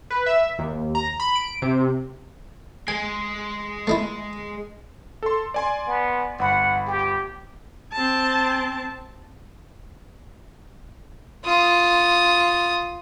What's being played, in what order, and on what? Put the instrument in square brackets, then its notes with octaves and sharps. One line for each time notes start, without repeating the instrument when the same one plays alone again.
[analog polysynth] B4
E5
D#2
A#5
B5
D7
C3
[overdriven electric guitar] G#3 [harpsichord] G#5
[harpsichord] A3 D#4 E4
[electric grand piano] A4 C6
D5 G#5 C6
[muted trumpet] B3
[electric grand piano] G1 B5 [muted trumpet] F#5
[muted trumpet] G4
[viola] C4 A5
[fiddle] F4 D#6